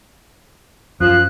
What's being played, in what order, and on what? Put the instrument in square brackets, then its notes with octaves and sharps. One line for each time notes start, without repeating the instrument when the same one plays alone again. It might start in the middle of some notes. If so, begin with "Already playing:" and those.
[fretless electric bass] F#2 [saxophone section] F3 [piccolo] F#6